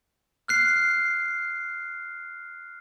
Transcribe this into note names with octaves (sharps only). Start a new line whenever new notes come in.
F6 F#6 C7